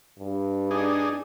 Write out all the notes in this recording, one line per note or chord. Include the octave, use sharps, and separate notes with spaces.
G2
D4 D#4 G#4